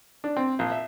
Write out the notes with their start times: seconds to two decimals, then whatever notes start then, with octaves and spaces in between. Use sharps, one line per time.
0.24 D4
0.37 C4
0.59 A#1
0.72 E5